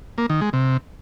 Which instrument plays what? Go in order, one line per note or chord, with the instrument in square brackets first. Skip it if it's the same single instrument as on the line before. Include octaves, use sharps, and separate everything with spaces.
[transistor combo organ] A#3
D#3
G#3
C3